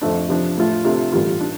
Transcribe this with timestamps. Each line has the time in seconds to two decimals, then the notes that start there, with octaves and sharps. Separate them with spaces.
0.01 F2 F3 A3 D4
0.29 C3 F3 D4
0.58 A2 A3 F4
0.85 C3 A3 D4 F4
1.12 A1 G2 G3 F4
1.41 D4